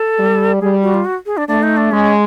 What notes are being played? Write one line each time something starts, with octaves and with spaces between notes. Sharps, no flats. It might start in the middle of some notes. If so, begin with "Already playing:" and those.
Already playing: A4
G3
G3 G#4
F#4
F4
F#4
G#4
D4
A3 D4
D#4
D4
G#3 C#4